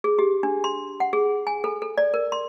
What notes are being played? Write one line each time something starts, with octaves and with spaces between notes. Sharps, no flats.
G#4
G4
D4
C6
F#5
G#4
G#5
A4
A4
D5
A#4
C6